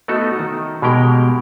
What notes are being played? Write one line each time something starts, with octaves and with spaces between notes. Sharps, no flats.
A3 B3 D#4 F#4 A4
D#3
B2 G#3 A#3 G4 A#4 G5